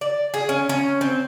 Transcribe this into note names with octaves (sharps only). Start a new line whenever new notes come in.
D5
G#4
C#4
C#4
C4